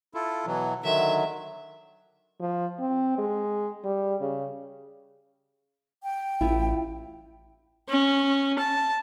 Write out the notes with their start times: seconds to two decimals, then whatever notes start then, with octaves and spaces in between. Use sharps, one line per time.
0.14 E4 F4 A4
0.46 B2 E3 F#3
0.84 D3 D#3 F#3 E5
2.41 F3
2.80 C4
3.18 G#3
3.84 G3
4.20 C#3
6.03 G5
6.41 A1 E4 F4
7.89 C#4
8.59 A5